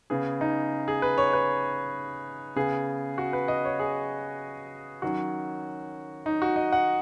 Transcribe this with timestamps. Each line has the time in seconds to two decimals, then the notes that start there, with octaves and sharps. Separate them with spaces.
0.10 C#3 B3 G#4
0.41 D#4
0.88 G#4
1.02 B4
1.18 C#5
1.33 B4
2.56 C#3 B3 G#4
3.18 F#4
3.33 B4
3.48 D#5
3.65 C#5
3.80 G#4
5.02 D#3 F#3 C#4 F#4
6.26 D#4
6.42 F#4
6.56 D#5
6.72 F#5